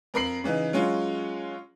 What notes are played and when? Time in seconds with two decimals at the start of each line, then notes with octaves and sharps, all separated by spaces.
0.14 F2 A#4 B5 C7 F#7
0.44 C#3 E3 D#4
0.73 F#3 G#3 C#4 F4